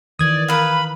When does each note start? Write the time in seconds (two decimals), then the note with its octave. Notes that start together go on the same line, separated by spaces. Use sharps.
0.19 D#3 E3 D5 D#6 G#6
0.48 A#4 B4 F5 B5